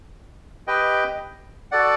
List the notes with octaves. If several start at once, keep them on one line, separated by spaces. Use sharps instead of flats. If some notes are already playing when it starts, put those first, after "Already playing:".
G4 B4 D#5 G5
F#4 A4 D5 F#5